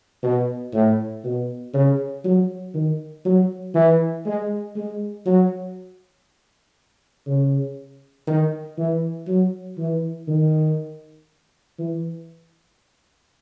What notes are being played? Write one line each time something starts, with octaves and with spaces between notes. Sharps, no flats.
B2
A2
B2
C#3
F#3
D#3
F#3
E3
G#3
G#3
F#3
C#3
D#3
E3
F#3
E3
D#3
E3